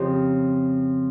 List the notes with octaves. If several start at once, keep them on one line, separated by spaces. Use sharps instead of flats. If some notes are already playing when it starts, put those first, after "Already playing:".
Already playing: F2 C#3 F3 G4